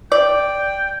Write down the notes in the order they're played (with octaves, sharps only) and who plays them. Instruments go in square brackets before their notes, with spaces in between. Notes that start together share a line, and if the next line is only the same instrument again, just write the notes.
[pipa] D5 [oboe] G5